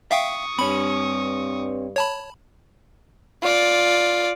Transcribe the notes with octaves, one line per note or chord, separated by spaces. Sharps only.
E5 F5 G5 C#6 D#6
G2 C4 C#5 B5
C#5 A5 B5
F4 D5